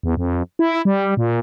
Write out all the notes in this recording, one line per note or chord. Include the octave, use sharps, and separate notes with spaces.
E2
F2
E4
G3
A#2